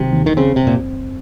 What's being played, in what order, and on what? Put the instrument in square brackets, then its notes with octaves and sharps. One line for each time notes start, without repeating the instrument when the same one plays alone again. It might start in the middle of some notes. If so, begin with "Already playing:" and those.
Already playing: [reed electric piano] D#2 D#3 F#3 [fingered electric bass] C3
[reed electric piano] D#2
[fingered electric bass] D#3
[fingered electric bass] C#3 [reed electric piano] C4
[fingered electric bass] C3
[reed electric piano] F#2 [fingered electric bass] A#2